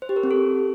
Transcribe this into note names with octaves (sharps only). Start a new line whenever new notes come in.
C5
G4
A#4
C4
A4